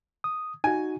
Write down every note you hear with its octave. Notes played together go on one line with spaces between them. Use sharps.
D#6
D#4 F#4 G#5